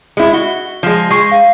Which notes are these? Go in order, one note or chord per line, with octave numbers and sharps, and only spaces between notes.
G#3 E4
F#4 G7
F3 G#3
G#3 C#6 C7
F5